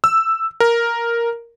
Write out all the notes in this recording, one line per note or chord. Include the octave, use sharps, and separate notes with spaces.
E6
A#4